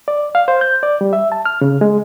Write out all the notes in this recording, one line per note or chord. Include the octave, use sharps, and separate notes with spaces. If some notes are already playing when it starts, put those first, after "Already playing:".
D5
F5
C5
G6
D5
G3
E5
A5
F6
C#3
G#3